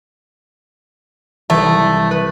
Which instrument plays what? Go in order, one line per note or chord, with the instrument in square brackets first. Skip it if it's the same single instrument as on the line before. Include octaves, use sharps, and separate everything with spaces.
[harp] C2 E3 [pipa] A3
[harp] B4